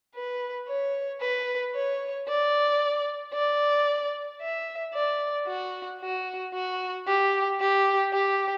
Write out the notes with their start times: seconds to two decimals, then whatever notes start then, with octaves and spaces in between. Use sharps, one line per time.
0.15 B4
0.68 C#5
1.21 B4
1.75 C#5
2.28 D5
3.34 D5
4.41 E5
4.94 D5
5.48 F#4
6.01 F#4
6.54 F#4
7.08 G4
7.60 G4
8.13 G4